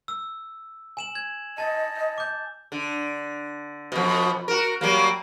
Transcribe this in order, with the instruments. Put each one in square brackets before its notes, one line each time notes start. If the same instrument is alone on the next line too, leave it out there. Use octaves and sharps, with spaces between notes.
[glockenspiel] E6
G#5 E7 F#7
G#6
[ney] D#5 [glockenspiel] A5 A6
[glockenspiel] D6 G6
[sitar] D3
F2 B2
F#4 A#4
F#3 G3 A#3